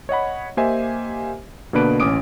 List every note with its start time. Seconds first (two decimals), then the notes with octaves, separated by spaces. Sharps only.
0.09 C#5 D#5 F#5 B5
0.57 A#3 G4 C5 D#5 E5 G#5
1.73 B2 D3 A#3 D4 B4 D7
2.00 A1 C#4 D6 D#6 D7